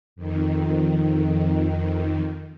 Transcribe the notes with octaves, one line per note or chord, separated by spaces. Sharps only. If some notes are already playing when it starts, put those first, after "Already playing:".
F2 D#3